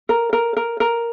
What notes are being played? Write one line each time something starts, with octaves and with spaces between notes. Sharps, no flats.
A#4
A#4
A#4
A#4